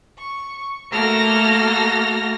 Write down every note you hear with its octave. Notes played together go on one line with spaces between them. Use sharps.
C#6
A3 A#3 F#4 A4 F6 A#6